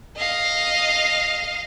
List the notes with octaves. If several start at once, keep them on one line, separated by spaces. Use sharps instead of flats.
D#5 F5